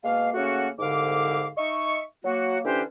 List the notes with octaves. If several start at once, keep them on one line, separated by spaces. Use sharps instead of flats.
B2 G#3 A#3 F5
C#3 A3 A#3 C#4 F#4
C2 G#2 D3 F5 D6
D#4 D#5 E5 C#6
F#3 A#3 F#4
D3 E3 C#4 D4 G4 C5